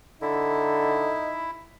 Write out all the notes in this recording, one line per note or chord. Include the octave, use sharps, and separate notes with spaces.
D3 D#4 E4